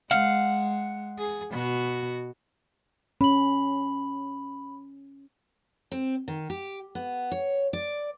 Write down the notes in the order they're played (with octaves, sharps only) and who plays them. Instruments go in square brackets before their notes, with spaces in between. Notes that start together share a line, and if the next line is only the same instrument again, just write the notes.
[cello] G#3 [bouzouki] F5 [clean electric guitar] F#5
[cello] G#4
B2 F#4
[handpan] C#4 [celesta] B5 F#7
[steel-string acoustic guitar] C4
D#3
G4
B3
C#5
D5